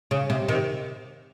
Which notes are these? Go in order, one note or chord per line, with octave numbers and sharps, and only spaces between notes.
C#3
C3
C3 D#3